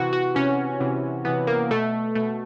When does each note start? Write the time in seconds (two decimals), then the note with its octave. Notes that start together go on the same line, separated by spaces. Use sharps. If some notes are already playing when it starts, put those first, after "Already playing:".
Already playing: C3 E3 F#4
0.13 F#4
0.35 C3 E3 C#4
0.80 C3 E3
1.25 C3 E3 B3
1.47 A#3
1.71 B2 A3
2.16 B2 A3